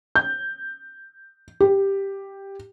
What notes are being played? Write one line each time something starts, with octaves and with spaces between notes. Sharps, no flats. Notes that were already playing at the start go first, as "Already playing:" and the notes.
G6
G4